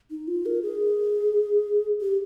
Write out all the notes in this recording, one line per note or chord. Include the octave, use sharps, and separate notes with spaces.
D#4
F4
A#4
G#4
G4